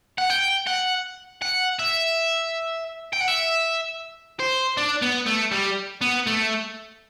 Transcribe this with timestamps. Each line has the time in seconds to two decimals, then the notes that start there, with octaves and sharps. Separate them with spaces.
0.18 F#5
0.30 G5
0.67 F#5
1.42 F#5
1.79 E5
3.13 G5
3.20 F#5
3.28 E5
4.40 C5
4.77 D4
5.02 B3
5.27 A3
5.51 G3
6.01 B3
6.27 A3